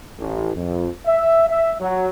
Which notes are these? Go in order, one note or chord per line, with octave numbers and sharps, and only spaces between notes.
A1
F2
E5
E5
F#3